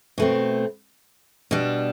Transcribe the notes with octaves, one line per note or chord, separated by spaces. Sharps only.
B2 A3 C4
B2 G3 D4